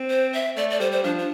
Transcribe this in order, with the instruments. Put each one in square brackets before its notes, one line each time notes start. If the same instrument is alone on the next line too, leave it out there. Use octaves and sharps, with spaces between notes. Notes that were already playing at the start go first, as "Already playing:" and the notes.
Already playing: [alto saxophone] C4
[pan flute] C5
E5
[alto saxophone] A3 [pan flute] D5
[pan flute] D5
[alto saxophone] G3 [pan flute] C5
[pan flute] C5
[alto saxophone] F3 [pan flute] D4
[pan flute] D4